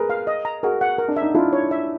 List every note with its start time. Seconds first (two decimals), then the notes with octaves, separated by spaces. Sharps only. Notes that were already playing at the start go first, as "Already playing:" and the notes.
Already playing: G#4 A#4 B4
0.10 F5
0.27 D#5
0.45 A#5
0.63 F#4 G#4 A#4
0.81 F#5
0.98 A#4
1.08 D4
1.17 E5
1.22 D#4
1.35 D4 E4 F4
1.53 C#5
1.71 E5